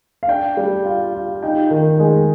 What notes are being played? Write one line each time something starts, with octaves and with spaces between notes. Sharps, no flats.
F5
D4 G5
G3
F4
F4
D#4 G5
D#3
G#3